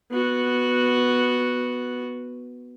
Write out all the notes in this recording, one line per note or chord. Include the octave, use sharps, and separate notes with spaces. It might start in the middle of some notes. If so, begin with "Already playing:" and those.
B3 F#4